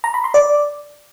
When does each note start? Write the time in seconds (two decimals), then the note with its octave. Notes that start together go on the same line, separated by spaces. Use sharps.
0.04 A#5
0.14 B5
0.24 C6
0.34 D5